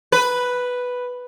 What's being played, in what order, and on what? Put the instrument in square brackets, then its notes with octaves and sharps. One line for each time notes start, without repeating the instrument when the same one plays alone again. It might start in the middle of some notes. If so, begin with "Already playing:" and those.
[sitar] B4